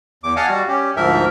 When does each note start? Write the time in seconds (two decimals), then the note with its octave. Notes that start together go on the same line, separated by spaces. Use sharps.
0.24 E2 D6
0.36 D#5 F5 F#5 G#5 A5
0.49 G3 F#4
0.68 C#4 G4
0.96 D2 G#2 F3 A#4 E5